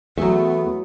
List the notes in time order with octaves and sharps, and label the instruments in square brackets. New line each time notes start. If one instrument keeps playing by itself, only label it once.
[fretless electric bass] E2 [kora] F#3 G#4 E5 [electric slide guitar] A3 [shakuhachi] B3